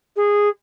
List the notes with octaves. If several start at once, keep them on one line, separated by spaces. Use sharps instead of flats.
G#4